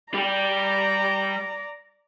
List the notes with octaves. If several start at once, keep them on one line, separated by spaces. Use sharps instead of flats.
G3 G4 D5 A#5